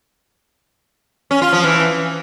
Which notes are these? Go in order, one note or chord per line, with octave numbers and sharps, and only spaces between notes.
C#4
F4
F3
E3